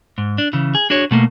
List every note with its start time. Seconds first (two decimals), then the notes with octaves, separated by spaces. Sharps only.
0.18 G#2
0.38 D4
0.53 C#3 E3
0.75 G#4
0.90 D4 F#4 G#4 C#5
1.11 B2 A3 A#3